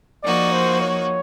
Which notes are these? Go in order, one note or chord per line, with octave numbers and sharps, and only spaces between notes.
F3 A#3 D#4 F#4 D5
C5
C#5